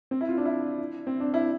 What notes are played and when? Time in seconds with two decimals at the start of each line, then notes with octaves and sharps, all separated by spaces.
0.11 C4
0.21 E4
0.29 F4
0.38 D4
0.45 E4
1.07 C4
1.20 D4
1.34 E4